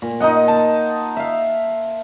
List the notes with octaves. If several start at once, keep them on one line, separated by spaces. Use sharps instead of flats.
A#2
D#4 F4 D#5 F#5
A5
E5 F5